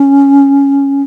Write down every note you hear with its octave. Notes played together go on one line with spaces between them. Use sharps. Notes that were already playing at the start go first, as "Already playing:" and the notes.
Already playing: C#4